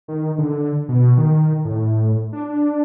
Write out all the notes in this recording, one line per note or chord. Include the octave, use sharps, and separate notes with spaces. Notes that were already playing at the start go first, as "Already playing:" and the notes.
D#3
D3
B2
D#3
A2
D4